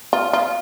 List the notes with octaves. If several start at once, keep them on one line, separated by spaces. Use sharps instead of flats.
F4
F4